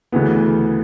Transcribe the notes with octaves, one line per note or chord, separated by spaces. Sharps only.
D2 C#3 E3 B3